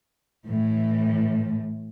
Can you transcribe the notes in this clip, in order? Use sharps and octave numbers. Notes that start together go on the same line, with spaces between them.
A2 E3